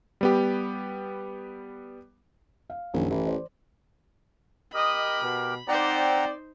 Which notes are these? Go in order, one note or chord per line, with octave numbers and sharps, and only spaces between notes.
G3 B3 G4
F5
A#1 F#2 D#3
A1 E3
C5 D5
G4 A#4 D#5 B5
B2
C4 D#4 C5 D5 F#5 G5 A#5